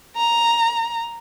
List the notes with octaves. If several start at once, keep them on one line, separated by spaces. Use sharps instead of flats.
A#5